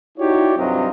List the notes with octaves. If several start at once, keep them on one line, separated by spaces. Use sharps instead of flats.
D#4 E4 F#4 G4 C#5 D5
C2 G2 C3 F#3 F4 D#5